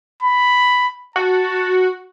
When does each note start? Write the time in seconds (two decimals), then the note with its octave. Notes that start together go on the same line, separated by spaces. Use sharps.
0.22 B5
1.16 F#4 A5